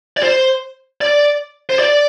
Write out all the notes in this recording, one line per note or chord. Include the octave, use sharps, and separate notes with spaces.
D5
C5
D5
C5
D5